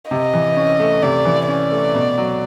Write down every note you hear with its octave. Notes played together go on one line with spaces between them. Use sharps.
C3 D#5
E3
C#4
A3
C3 D5
E3
C#4 D5
A3
B2
F#3